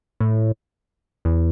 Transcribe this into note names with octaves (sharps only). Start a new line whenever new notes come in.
A2
E2